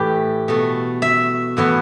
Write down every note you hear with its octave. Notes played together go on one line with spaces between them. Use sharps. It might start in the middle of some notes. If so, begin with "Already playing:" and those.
Already playing: A2 E3 A3 G4 B4
B2 A3
E5
A2 E3 B3